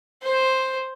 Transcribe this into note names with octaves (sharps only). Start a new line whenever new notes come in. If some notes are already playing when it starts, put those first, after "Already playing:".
C5